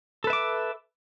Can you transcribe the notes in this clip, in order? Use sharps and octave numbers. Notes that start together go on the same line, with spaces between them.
A4 B4 E5 D6